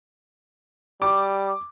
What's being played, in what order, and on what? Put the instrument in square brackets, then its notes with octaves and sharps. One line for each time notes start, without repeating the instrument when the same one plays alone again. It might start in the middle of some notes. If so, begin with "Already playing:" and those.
[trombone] G3 [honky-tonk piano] D6